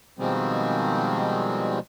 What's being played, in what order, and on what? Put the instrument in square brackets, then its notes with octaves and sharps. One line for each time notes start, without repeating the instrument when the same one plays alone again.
[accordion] B2 D#3 F3 G3 G#3 C4